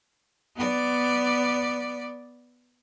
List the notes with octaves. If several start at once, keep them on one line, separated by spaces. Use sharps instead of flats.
B3 D5